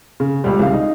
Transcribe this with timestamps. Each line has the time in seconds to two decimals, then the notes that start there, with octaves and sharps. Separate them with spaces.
0.20 C#3
0.44 C#2 G3
0.60 C2 C#3 F5
0.73 D#4